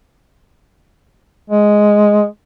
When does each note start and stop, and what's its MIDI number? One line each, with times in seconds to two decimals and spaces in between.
1.50 2.25 56